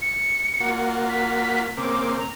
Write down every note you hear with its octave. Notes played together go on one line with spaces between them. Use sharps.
C#7
A#3 F4 F#4
B6
C#3 A#3 C4 D6
A#5